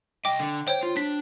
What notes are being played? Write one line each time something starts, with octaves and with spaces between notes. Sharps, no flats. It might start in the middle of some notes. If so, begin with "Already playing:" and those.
C2 D#5 G5 D6
D3
C5 C#5 G5
F4
D4 B6